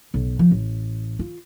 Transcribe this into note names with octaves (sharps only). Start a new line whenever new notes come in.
B1
F3
A1
F4